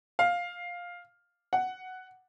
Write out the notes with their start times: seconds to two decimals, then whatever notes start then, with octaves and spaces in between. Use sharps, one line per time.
0.19 F5
1.53 F#5